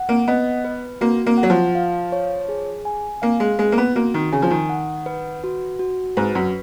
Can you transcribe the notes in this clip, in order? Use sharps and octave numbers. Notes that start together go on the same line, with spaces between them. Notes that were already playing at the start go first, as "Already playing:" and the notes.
Already playing: F#5
A#3
B3 D#5
B4
A#3 F#4
A#3
F#5
F#3
F3
F5
C#5
G#4
G#5
A#3 F5
G#3
G#3 B4
A#3
B3
A#3 F#4
D#3
C#3 G#5
F3
D#3
F#5
B4
F#4
F#4
G#2 B4
F#2